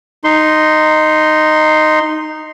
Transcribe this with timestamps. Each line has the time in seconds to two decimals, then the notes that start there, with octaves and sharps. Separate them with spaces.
0.24 D#4 C6